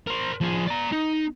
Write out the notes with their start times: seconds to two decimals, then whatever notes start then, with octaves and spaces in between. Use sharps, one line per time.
0.07 A#4 C5
0.41 F3 G#4
0.67 D5 A#5
0.92 D#4